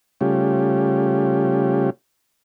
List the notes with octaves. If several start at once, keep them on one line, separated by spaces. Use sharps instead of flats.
C#3 G3 A3 C#4 F4 G4